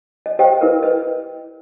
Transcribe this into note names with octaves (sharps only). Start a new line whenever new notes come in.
D#5
G4 C5 D#5 F5 G5
E4 A#4 B4
B4 D#5